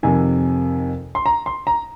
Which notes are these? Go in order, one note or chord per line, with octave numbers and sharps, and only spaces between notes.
F2 C3 D#3 G#5
C6
A#5
C6
A#5